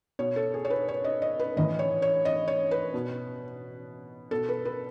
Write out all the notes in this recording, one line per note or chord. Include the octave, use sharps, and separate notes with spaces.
B2 C#5
A4
G#4
C#5
B4
C#5
D#5
D#5
B4
A2 E3 D#5
C#5
C#5
D#5
C#5
B4
B2
B2 A4
B4
B4